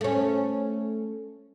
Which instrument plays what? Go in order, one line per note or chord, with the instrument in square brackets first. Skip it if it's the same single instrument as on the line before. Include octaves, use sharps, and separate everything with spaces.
[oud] A3 C#4